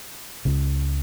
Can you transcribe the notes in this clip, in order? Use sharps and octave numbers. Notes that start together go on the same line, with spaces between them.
C#2 C#3